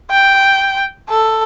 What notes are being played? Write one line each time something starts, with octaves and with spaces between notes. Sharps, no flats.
G5
A4